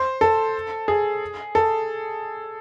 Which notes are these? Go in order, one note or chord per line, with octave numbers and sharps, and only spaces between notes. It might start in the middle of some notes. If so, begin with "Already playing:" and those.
Already playing: C5
A4
G#4
A4